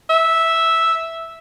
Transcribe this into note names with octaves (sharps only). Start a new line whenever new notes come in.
E5